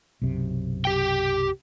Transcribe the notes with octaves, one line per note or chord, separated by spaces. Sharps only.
B1 F#2 C3
G4 G5